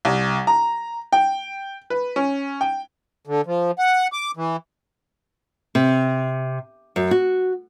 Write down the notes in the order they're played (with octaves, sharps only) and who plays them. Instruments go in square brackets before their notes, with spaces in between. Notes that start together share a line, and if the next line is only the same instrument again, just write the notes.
[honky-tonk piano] C2
A#5
G5
B4
C#4
G5
[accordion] D3
F3
F#5
D6
E3
[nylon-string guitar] C3
F#2
F#4